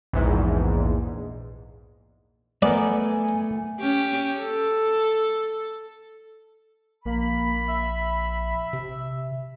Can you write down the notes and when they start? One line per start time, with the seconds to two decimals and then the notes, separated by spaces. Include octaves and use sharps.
0.13 A#1 E2 G#2
2.62 A3 B3 A#4 D5 G#5
3.80 C#4 G4
4.38 A4
7.05 A#1 A#3 B5
7.68 E5
8.73 C3